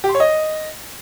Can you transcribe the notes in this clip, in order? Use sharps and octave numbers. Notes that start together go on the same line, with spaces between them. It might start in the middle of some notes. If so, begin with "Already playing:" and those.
G4
C6
C#5
D#5